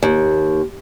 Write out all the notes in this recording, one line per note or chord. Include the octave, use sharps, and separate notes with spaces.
D#2